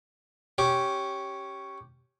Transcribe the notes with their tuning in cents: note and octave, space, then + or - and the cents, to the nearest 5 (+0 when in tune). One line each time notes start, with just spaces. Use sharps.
C#4 +0 G4 -10